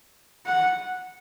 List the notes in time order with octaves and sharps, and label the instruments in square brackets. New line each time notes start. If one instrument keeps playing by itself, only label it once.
[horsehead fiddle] F#5